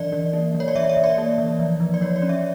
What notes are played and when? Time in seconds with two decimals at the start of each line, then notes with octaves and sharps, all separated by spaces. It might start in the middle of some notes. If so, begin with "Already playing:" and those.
Already playing: E3 D5
0.12 E3
0.33 A#3
0.55 E3
0.60 C#5
0.68 D5
0.75 E3 E5
0.89 E5
0.97 E3
1.04 D5
1.18 A#3
1.38 E3
1.59 F3
1.80 F3
1.94 D5
2.01 F3 C#5
2.16 D5
2.22 C#4
2.29 E5